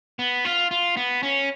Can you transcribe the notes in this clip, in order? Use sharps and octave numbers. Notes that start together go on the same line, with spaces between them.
B3
F4
F4
B3
C#4